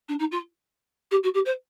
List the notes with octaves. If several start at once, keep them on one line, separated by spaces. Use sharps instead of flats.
D4
D#4
F4
G4
F#4
G4
C5